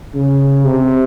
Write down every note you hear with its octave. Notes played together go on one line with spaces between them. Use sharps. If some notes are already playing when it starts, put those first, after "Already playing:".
C#3
C3